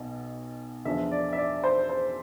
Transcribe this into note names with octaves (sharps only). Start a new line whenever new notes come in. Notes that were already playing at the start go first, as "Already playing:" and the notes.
Already playing: B1 B2
E2 D3 F3 E5
D5
E5
D5
C5
C5